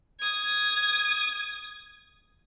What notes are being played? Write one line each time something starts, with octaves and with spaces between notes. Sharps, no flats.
D#6 G#6